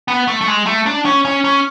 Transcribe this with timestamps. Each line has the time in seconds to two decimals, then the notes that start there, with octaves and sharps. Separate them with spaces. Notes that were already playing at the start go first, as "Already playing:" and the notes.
0.08 B3
0.28 A3
0.41 A3
0.48 G#3
0.66 A3
0.86 D4
1.05 C#4
1.25 C#4
1.44 C#4